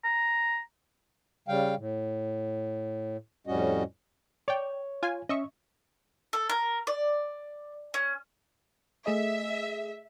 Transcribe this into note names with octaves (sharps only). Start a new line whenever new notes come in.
A#5
C#3 G3 F5 G5
A2
F2 A2 G3 C#4 F#4 D#5
C#5 D5 G5
F4 G#5
C#4 D#5 E5 C#6
A4
A#4
D5
C#4
A3 G#4 D#5 E5